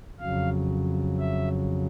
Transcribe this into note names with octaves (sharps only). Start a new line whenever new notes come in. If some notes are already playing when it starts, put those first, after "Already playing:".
F2 C#3 F#3 F5
E5